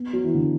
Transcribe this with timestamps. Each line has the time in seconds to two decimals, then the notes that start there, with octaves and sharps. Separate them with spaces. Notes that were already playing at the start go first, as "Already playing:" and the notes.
Already playing: B3
0.13 F#3
0.24 E3
0.35 D3